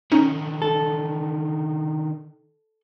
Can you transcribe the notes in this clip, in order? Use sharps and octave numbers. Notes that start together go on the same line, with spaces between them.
D3 D#3 C#4 D#4
A4